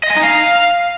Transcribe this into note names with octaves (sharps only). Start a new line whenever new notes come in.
D#5
G#5
D#4
F5